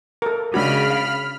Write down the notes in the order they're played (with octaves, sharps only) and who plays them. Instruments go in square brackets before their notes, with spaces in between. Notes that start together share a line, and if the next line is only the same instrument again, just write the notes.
[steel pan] A4 A#4
[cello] C#3 [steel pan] G#3 D4 F#4 [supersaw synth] B5 F6
[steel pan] F5